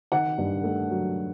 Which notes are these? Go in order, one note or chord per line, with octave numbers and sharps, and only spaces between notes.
D#3 F#5
G2
A3
F#3